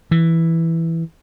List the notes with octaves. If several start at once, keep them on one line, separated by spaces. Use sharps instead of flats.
E3